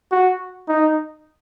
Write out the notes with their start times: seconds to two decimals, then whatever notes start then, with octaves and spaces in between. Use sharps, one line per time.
0.12 F#4
0.68 D#4